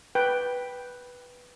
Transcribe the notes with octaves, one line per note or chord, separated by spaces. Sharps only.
B4 G5